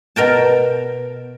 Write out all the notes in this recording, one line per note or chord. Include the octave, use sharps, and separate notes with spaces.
B2 A#4 G5 A5